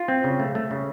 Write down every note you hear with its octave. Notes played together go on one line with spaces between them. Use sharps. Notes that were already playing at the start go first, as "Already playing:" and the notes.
Already playing: F4
C4
C#3
A3
A3
C#3